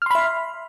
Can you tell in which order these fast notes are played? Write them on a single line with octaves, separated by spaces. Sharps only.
F6 C6 B5 E5